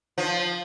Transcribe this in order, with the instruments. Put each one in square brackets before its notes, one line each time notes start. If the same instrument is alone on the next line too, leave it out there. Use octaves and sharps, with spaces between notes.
[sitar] F3